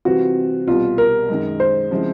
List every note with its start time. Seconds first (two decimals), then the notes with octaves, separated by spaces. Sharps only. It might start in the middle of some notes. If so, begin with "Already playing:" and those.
0.05 C3 E3 G3 C4 F4 F#4
0.68 C2 B2 G3 F4
0.98 A#4
1.29 F#2 D#3 G#3
1.60 C5
1.91 C#3 F3 G#3 C4 E4